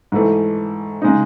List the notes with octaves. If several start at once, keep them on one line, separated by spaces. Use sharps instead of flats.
G#2 E3 A3
C#3 G#3 D#4